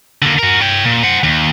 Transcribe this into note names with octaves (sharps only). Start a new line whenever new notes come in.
D3 A#3
F#4 A#4
C#5 G5
A#2
C5 F#5
D#2